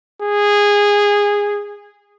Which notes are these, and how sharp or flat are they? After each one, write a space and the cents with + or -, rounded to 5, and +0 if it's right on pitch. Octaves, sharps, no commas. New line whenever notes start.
G#4 -15